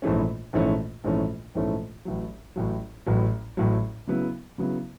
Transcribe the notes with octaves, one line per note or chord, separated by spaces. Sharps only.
A#1 G#2 E3 A3 C#4
A#1 G#2 E3 A3 C#4
A#1 G#2 E3 A3 C#4
A#1 G#2 E3 A3 C#4
A1 A2 F#3
A1 A2 F#3
A1 A2 F#3
A1 A2 F#3
C#3 F#3 B3 E4
C#3 F#3 B3 E4